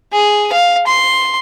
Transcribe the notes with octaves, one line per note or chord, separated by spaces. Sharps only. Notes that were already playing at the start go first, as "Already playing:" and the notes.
G#4
F5
C6